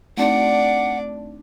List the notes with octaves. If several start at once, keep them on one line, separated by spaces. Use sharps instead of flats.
A3 C4 D4 D#4 D5 F#5